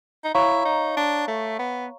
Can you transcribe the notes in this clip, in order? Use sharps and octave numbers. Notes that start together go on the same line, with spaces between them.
D#4
E4 C#5 F5 A#5 C#6
D#4
D4
A3
B3